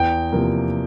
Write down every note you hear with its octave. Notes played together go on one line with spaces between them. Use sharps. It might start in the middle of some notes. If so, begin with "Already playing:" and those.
Already playing: E2 G5
C3 F3 A#3